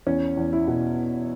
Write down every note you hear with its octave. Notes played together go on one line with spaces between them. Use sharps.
E2 C#4
E2
E4
B2